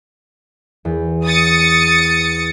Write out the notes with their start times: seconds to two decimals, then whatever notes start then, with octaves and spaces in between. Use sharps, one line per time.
0.85 E2
1.26 D#6 A6 C#7